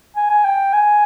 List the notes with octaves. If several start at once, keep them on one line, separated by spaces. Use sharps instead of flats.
G#5
G#5
G5
G#5